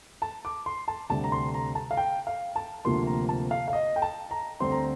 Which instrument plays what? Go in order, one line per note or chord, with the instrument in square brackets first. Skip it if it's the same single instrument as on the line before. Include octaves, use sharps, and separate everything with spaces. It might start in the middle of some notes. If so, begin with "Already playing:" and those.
[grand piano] A5
D6
C6
A5
D2 C3 G3 A5
A#5
C6
A#5
A5
F5
G5
F5
A5
D2 C3 F3 A#3 C6
A#5
A5
F5
F5
D#5
G5
A5
A#5
D2 D3 G3 C4 C6
A#5